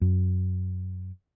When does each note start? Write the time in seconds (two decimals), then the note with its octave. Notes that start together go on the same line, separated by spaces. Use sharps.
0.01 F#2